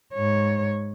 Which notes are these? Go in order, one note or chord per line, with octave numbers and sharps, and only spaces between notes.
G#2 C#5